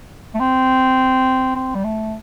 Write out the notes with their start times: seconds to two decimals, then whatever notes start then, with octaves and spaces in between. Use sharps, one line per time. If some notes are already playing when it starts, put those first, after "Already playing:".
0.34 A3
0.40 C4
1.55 C4
1.75 G3
1.84 A3